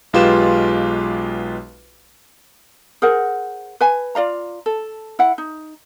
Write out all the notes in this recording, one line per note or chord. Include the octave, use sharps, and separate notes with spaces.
B1 G#3 F4 G4 B4 E7
G#4 A#4 C5 F#5
B4 G#5
F4 D5 F5 A#5
A4
E4 F#5
D#4